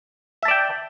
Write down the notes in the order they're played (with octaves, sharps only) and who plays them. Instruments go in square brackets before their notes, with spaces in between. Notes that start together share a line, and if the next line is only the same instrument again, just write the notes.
[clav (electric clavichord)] E5
A5
D5
G5